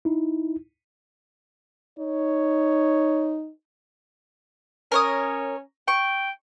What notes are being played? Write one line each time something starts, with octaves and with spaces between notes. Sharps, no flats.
D#4 E4
D#4 C#5
C#4 A#4 C#5 D#6
G5 C#6